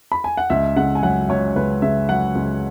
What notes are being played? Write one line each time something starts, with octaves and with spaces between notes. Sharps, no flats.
B5
G#5
F#5
C#2 E5
C#3 F#5
G#5
F#3 F#5
C#2 C#5
C#2 B4
C#3 E5
F#3 F#5
C#2